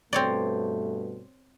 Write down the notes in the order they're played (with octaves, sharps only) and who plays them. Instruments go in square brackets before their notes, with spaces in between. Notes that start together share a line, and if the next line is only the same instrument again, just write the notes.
[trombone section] G2 B2 A3 [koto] C4 C#5 D5